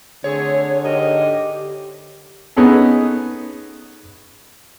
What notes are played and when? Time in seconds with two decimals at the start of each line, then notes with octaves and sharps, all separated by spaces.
0.24 D3 A3 C4 G#4 C#5
0.84 G#2 G4 A#4 D#5
2.56 B3 C#4 D#4 G#4 A4